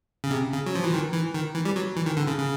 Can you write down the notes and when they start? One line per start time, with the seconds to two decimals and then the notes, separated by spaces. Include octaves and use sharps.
0.24 C#3
0.31 C3
0.52 C#3
0.66 F#3
0.75 F3
0.84 E3
0.93 D#3
1.14 E3
1.34 D#3
1.55 E3
1.65 G3
1.76 F#3
1.96 E3
2.06 D#3
2.17 D3
2.27 C#3
2.38 C#3